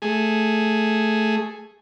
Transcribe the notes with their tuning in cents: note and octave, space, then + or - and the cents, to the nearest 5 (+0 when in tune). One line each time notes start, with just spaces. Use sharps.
A3 +0 G#4 +0